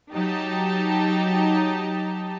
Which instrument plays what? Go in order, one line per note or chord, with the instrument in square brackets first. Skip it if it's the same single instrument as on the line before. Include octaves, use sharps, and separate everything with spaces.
[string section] F#3 D#4 G4 A5